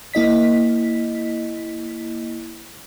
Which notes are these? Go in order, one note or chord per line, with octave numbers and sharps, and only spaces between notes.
A#3 E4 D#5 B6